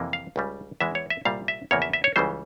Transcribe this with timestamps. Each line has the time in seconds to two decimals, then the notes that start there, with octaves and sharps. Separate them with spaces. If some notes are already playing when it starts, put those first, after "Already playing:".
Already playing: F2 C3 E3 A#3
0.13 F5
0.36 C#2 C#3 G3
0.80 E2 E3 G#3 E5
0.95 C#5
1.10 E5
1.25 C2 A#2 G3 F5
1.48 E5
1.71 E2 C#3 F3 A#3 C#5
1.82 E5
1.93 E5
2.04 C#5
2.16 C#2 C#3 E3 G3 C5